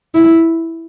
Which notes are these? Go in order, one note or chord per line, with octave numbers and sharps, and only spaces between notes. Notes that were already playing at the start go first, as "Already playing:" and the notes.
E4